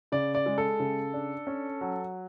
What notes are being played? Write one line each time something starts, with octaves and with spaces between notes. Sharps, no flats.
C#3 D5
D5
G#3
A4
C#3
D4
C#4
F#3